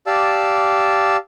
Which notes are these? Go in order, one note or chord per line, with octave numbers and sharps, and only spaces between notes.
G4 D5 F5 A5 E6